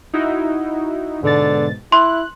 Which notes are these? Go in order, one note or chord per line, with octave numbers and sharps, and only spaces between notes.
D#4 E4 F#4
G#2 B2 D3 A6
E4 C6 F#6